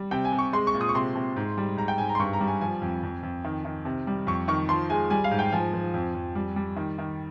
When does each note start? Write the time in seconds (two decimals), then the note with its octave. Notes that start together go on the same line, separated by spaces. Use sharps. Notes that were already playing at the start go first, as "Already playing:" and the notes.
Already playing: G3
0.11 C3 G5
0.25 G#5
0.33 C3
0.38 C#6
0.53 G#3 C6
0.67 C#6
0.74 A#2
0.81 D#6
0.89 C#6
0.95 C3 C6
1.16 C3
1.36 G#2
1.58 G3
1.77 G#2 A#5
1.88 G5
1.98 G#2 G#5
2.09 A#5
2.15 C6
2.19 G2 C#6
2.33 A#5
2.41 G3
2.47 G#5
2.61 F3 G#5
2.82 F2
3.03 F2
3.23 F2
3.45 D#3
3.65 D#3
3.85 C3
4.07 G3
4.27 F2 C#6
4.48 D#3 C#6
4.69 F3 C6
4.90 G#3 G#5
5.10 G3 G#5
5.24 F5
5.31 G#2
5.39 G5
5.52 F3 G#5
5.73 F3
5.94 F2
6.15 F2
6.35 G3
6.56 G3
6.76 D#3
6.98 D#3